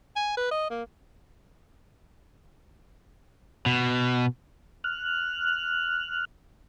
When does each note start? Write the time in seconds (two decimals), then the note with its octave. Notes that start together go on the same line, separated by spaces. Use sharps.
0.16 G#5
0.37 B4
0.51 D#5
0.70 A#3
3.66 B2
4.84 F6 F#6